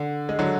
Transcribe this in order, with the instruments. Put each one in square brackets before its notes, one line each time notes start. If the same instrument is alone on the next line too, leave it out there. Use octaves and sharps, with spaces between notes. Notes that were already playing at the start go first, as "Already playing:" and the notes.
Already playing: [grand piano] D3
G#3
D3 F#3